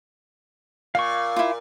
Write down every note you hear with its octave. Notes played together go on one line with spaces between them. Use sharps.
A#2 F5 C#6
E4 F4